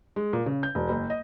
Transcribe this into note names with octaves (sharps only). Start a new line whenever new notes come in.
G#3
A#2
C#3
G6
E1
F#1
D#5